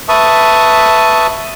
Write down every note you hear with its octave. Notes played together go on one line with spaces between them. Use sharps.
B4 E5 A5 C#6 D#6